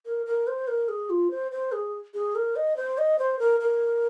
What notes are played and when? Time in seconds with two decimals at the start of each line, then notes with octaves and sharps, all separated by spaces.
0.06 A#4
0.26 A#4
0.47 C5
0.68 A#4
0.89 G#4
1.10 F4
1.31 C5
1.52 C5
1.72 G#4
2.14 G#4
2.35 A#4
2.56 D#5
2.77 C5
2.98 D#5
3.19 C5
3.39 A#4
3.60 A#4